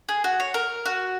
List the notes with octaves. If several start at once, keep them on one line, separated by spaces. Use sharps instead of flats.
G#4
F#4
C#5
A#4
F#4